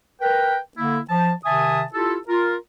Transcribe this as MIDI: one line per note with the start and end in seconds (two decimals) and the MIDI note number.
0.21 0.57 70
0.21 0.57 71
0.21 0.57 79
0.78 0.99 50
0.78 0.99 58
0.78 0.99 64
1.10 1.31 53
1.10 1.31 81
1.45 1.82 48
1.45 1.82 51
1.45 1.82 76
1.45 1.82 80
1.45 1.82 81
1.45 1.82 87
1.93 2.16 64
1.93 2.16 65
1.93 2.16 67
1.93 2.16 69
2.28 2.55 65
2.28 2.55 70